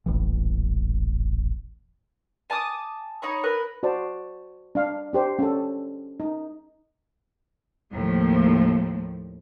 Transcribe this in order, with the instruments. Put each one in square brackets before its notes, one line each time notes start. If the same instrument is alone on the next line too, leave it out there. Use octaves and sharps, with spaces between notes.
[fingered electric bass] D#1 A1 E3
[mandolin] G#5 A5 D6 D#6
D#4 C#5 B5 C#6
A#4 B4 F#6
[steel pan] F#4 C5 D5 A5
D4 F5
D4 G4 C5
C#4 A4
D#4
[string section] D#2 A2 F3